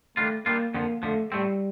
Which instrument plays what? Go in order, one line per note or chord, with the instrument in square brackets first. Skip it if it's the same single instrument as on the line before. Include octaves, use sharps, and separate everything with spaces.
[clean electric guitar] D#3 G3 D4 F4 [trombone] A3
[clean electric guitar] D#3 G3 D4 F4 [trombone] A#3
[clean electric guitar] F2 D3 F3 [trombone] A#3
[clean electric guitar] F2 D3 F3 [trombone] A3
[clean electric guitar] A2 A3 C4 [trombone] G3